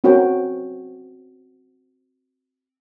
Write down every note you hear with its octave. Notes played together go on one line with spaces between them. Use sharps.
C4 C#4 F#4 A#4 C#5 G5